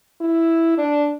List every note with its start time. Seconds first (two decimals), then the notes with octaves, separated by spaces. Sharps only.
0.21 E4
0.78 D4